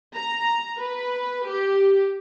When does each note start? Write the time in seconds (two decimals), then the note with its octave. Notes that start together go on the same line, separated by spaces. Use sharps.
0.15 A#5
0.78 B4
1.48 G4